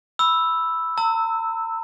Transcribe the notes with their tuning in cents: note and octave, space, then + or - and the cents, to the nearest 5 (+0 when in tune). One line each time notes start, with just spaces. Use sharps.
B5 +0 E6 +0
A#5 -45 E6 -10